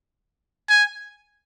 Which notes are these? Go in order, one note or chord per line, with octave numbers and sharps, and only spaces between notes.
G#5